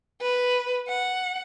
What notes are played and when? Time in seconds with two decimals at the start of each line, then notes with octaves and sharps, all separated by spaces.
0.21 B4
0.88 F#5